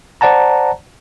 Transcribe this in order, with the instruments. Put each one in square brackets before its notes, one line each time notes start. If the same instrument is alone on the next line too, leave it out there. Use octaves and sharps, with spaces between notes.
[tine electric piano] C5 D5 F#5 A5 A#5